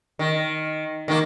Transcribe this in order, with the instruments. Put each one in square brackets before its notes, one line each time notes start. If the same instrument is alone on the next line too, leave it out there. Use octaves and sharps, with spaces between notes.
[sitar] D#3
[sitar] D#3 A#3 [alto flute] D#4